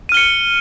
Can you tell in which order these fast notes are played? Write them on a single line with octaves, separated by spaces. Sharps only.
D#7 F6 G7 C#7